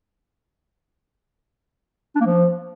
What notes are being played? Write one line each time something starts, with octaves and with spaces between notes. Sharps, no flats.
D4
A#3
F3